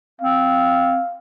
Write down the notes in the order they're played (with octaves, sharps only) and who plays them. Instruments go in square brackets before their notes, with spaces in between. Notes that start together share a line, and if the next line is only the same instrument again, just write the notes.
[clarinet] C4 [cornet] F5